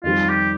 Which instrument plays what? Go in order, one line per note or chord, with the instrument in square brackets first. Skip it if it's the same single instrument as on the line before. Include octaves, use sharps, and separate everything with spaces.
[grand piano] F2 D#3 G3 C4 [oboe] F4
[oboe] G4